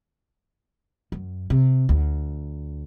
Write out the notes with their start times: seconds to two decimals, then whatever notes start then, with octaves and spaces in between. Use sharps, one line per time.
1.12 F#2
1.50 C3
1.89 D2